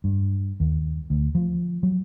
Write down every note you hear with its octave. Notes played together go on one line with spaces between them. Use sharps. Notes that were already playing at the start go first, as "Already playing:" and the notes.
G2
D#2
D2
F3
F#3